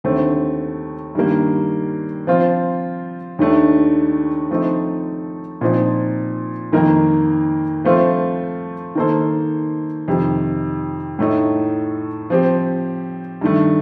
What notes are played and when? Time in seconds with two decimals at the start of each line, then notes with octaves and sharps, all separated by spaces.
0.04 D#2 D3 A3 C4
1.15 G2 D#3 G3 A#3
2.27 F3 C4 F4
3.39 D#2 D#3 A3 D4
4.51 F3 A3 C4 D#4
5.61 A#2 F3 C4 D#4
6.72 F2 D#3 A#3 D#4 A#4
7.84 F3 A3 C4 F4 C5
8.95 D#3 A#3 D#4 A4 C5
10.08 F2 C3 D#3
11.19 A2 A3 D#4
12.30 F3 C4 G4
13.41 G2 D#3 A3